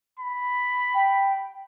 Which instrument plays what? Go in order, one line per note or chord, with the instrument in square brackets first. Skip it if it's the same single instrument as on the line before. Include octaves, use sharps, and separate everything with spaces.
[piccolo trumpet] B5
[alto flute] G5